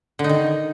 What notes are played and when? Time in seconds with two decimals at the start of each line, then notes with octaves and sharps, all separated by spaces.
0.19 D3
0.24 D#4
0.29 D#3